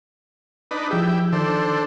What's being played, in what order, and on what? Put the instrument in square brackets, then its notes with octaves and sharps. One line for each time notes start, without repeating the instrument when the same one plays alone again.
[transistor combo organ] D4 D#4 B4
[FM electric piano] F3 G#4 [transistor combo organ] E4 G4
[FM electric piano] D#3 [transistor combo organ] D4 A4 C5